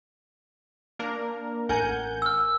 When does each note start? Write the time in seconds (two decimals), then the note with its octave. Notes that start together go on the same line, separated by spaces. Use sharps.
0.99 A#3 D4 A#4
1.69 A1 A#4 F#5 G#5 G6
2.22 E6 F6